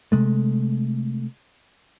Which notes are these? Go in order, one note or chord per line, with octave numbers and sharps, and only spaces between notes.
C3 G#3 A3